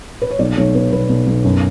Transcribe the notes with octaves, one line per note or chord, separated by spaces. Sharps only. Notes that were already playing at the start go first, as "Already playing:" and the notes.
B4
C#5
B1 D5
B1 C#5
B2 B4
B1 B4
B1
B1
F#2